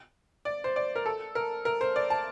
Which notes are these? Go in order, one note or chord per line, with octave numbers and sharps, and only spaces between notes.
D5
C5
D5
A#4
A4
A#4
A#4
C5
D5
A5